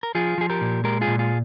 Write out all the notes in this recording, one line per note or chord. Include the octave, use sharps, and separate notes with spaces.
A#4
F3 F4 G#4
F3 G#4
G4 A#4
A#2
G#3 G4 A#4
F4 G#4
A#2
F4 G#4